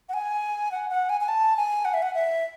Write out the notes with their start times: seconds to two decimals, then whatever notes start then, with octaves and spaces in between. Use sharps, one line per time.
0.09 F#5
0.14 G#5
0.71 F#5
0.90 F#5
1.09 G#5
1.21 G#5
1.28 A5
1.57 G#5
1.85 F#5
1.94 E5
2.02 F#5
2.14 E5